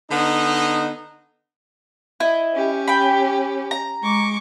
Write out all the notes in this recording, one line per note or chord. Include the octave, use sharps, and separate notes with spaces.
D3 B3 D#4
E4 D#5
C#4 G4
G5 B5
A#5
G#3 C#6 D6